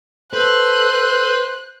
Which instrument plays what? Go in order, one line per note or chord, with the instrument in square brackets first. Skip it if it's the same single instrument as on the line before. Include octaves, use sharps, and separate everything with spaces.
[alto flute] A4 [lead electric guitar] B4 [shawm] C5 [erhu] F#6